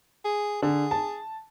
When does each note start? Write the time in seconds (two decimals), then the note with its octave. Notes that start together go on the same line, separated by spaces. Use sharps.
0.25 G#4
0.62 D3 G#4
0.91 A5